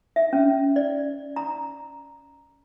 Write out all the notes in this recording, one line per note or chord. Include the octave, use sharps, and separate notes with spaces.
E5
C#4
D5
A#5